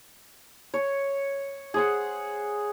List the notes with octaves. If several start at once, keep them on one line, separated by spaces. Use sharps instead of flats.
C#5
G#4 C5 F#5